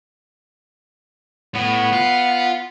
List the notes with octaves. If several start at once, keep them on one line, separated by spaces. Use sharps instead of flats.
A2 B3
F4